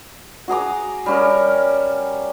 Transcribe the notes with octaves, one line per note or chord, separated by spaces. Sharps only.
F#4 G#4 A#5 D6
G3 C#4 A#4